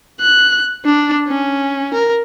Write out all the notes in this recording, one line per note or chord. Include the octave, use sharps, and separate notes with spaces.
F#6
D4
C#4
A#4